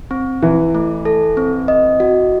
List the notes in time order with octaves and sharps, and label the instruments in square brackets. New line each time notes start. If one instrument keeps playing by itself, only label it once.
[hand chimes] C4
[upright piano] E3 [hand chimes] E4
[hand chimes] A3
A4
C4
D#5
F#4